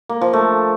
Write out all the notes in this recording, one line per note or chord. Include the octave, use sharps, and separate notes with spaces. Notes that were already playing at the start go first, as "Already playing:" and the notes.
A#3
F3
A3